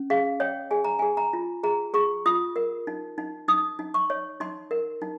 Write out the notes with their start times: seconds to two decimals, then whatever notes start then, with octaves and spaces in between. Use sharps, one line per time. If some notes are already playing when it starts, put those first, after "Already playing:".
Already playing: C#4
0.10 G#4 F5
0.40 C#5 G5
0.71 G#4 G#5
0.84 A#5
0.99 G#4 G#5
1.17 A#5
1.33 F4
1.63 G#4 A#5
1.94 G#4 C#6
2.26 F4 D#6
2.56 A#4
2.87 D#4
3.18 D#4
3.48 D#4 D#6
3.79 D#4
3.94 C#6
4.10 C#5
4.40 D#4 C6
4.71 A#4
5.02 D#4